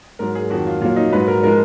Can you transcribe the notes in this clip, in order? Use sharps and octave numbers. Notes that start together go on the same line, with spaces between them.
G#2 F#3 A#4
G#4
F2 D#3 F#3 F#4
F4
A#2 F#3 F4
D#4
G#2 F#3 B4
A#4
F3 G#3 A#4